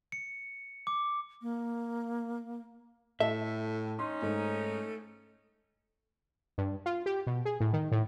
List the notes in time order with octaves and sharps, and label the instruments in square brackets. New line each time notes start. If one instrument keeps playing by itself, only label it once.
[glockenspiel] C#7
D6
[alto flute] A#3
[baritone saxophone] A2 [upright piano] A4 [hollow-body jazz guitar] E5
[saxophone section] C#4 D#4 [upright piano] C6
[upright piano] G#2 [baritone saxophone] A3
[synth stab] G2
F4
G4
B2
G#4
A2
D#3
A2